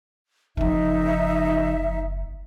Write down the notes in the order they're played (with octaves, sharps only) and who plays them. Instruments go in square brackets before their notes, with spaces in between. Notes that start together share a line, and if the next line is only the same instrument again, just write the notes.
[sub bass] F#1 [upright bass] C#3 F3 [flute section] D#4 E5